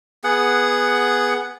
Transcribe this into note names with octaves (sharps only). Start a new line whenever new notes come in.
B3 G#4 F#5